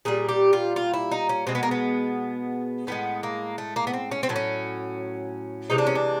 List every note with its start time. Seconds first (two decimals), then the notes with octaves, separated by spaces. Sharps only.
0.05 A#2 G3 G#4
0.29 G4
0.53 F4
0.76 F4
0.94 E4
1.12 D#4
1.29 C#4
1.47 B2 G#3 C4
1.55 B3
1.63 A#3
1.71 B3
2.87 A2 E3 G#3 B3
3.23 A#3
3.58 A3
3.76 A#3
3.87 B3
3.93 C4
4.12 C#4
4.23 C4
4.29 A2 F#3 A3
4.36 C#4
5.70 C3 E3 G#3 D#4
5.78 D4
5.87 C#4
5.95 D4